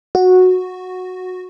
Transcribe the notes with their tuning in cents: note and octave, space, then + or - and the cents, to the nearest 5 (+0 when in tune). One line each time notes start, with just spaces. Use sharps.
F#4 -10